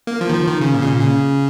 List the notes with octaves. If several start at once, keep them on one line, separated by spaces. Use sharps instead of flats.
A#3
F3
D#3
F3
D#3
C#3
A#2
C#3
A#2
C#3